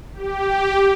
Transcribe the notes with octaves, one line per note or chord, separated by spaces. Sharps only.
G4